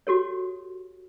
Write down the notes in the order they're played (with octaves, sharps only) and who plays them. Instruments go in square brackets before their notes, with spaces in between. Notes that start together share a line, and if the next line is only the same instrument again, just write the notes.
[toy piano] F#4 G4 A4 C#5